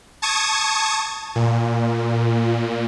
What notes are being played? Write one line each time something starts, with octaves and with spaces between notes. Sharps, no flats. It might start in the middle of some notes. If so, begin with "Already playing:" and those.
A5 C#6 D#6 G#6
A#2